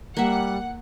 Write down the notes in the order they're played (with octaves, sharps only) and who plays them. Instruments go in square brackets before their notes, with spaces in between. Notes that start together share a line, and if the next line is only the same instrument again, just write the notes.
[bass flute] G3 [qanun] A#3 E5 [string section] F#5